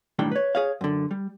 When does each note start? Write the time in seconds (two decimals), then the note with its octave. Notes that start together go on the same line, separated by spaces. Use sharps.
0.19 B1 A2 D#3 G3 D4 G5
0.31 B4 C#5
0.55 G#4 C#5 F5
0.81 F#2 D3
1.11 G3